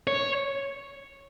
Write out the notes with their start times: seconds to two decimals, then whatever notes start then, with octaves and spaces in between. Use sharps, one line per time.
0.07 C#5